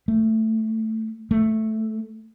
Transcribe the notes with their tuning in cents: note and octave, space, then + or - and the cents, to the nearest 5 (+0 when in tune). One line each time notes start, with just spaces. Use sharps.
A3 +10
A3 +0